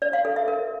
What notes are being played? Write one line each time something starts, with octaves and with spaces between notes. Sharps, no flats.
D5
F5
A4
E5
A#4